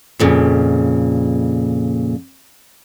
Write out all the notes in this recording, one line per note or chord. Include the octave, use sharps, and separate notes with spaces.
F2 A#2 C#3